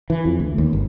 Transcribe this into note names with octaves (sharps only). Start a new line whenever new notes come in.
E3
F2
D2
D#2
G1